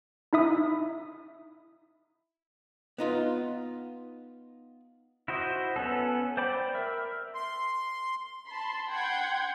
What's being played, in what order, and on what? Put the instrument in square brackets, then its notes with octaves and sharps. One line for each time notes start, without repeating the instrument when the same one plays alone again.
[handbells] D#4 E4 E5 D#6
[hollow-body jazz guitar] B3 D#4 F4
[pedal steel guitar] E4 F#4 C5 D#5
B3 C#4 A4
C5 D5 G5 B5 D6
A#4 E5
[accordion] C6
[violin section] A5 B5 C6
F#5 G5 C6 G6 G#6